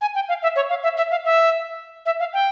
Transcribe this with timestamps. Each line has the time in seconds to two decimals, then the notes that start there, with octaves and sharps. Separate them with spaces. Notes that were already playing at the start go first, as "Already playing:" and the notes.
0.01 G#5
0.15 G5
0.29 F5
0.43 E5
0.56 C#5
0.69 F5
0.83 E5
0.97 E5
1.11 F5
1.25 E5
2.06 E5
2.20 F5
2.33 G5